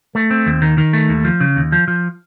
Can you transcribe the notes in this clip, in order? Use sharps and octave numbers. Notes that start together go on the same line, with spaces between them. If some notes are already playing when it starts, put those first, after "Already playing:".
A3
C4
D#2
D#3
D#3
A3
D#2
F3
C#3
D#2
F3
F3